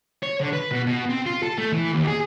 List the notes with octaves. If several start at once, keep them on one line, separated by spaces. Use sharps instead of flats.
C#5
D3
B4
B2
B2
C4
F4
A4
A3
E3
D#2
G#4